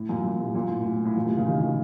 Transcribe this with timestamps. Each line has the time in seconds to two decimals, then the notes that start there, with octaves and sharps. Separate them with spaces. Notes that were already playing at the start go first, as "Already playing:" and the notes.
Already playing: A2
0.09 F#2 A#2
0.24 F#2 A#2
0.40 A2 C3
0.54 F#2 A#2
0.70 A2
0.85 A2
0.95 A2
1.05 A2
1.16 F#2 A#2
1.27 A2 C3
1.37 A#2 C#3
1.46 C3 D#3
1.62 D#3 F#3